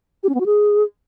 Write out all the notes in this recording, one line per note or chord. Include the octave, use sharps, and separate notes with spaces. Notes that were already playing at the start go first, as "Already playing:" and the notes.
G4
C#4
B3
F#4
G#4